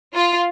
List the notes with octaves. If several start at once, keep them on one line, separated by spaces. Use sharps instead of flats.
F4